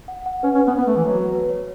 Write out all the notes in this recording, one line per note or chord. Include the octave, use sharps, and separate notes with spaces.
F#5
F#5
C#4 B4
C#4
B4
B3
B3 B4
A3
E3 B4
F#3
F#4
B4
C#5